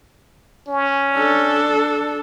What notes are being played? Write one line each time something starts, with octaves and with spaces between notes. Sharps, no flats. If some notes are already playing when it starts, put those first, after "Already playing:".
C#4
D4 A4